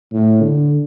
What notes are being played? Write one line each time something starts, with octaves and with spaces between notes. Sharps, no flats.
A2
D3